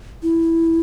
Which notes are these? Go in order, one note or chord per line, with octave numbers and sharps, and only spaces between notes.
E4